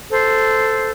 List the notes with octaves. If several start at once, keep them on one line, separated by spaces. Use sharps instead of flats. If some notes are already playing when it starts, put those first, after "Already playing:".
A4 C5